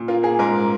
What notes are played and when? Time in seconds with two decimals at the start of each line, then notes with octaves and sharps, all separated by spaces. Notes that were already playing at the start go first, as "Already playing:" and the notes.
Already playing: A#2
0.08 A#3 F4
0.23 A#3 G#4
0.39 G#2 A#4